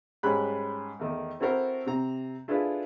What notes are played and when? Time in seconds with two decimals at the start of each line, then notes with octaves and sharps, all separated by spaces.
0.23 G#2 G3 C#4 B5 F#6
0.99 E2 D#3 A3
1.40 C4 E4 F#4 A4 A#4 C5
1.87 C3 A#5
2.48 D4 E4 F4 G#4 A4 B4